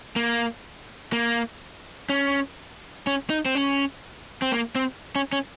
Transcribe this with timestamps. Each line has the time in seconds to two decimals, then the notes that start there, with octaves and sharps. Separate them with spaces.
0.16 A#3
1.13 A#3
2.09 C#4
3.07 C#4
3.30 D#4
3.46 C4
3.55 C#4
4.42 C4
4.52 A#3
4.75 C4
5.16 C#4
5.33 C#4